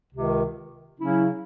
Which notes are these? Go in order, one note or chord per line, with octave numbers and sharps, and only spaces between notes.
C#2 C3 D#3
C#3 F#3 C#4 E4